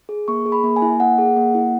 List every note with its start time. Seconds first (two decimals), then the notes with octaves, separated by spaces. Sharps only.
0.09 G#4
0.28 A#3 C#6
0.46 G#4
0.52 B5
0.63 A#3
0.76 G#5
0.82 E4
1.00 A#3 F#5
1.18 G#4
1.37 A#3
1.55 E4